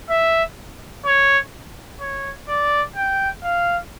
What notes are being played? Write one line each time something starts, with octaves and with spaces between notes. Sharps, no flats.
E5
C#5
C#5
D5
G5
F5